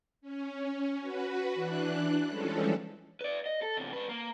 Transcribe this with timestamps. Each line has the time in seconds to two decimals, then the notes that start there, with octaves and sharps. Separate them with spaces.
0.21 C#4
1.00 F#4 B4
1.55 E3 D4 F#6
2.28 E3 F3 G3 G#3 C#4 A4
3.21 B4 D5
3.46 D#5
3.62 A4
3.77 E2 C3
3.93 G#2 B4
4.09 A#3